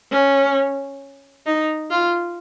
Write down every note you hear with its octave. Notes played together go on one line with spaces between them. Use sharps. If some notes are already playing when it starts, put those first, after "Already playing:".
C#4
D#4
F4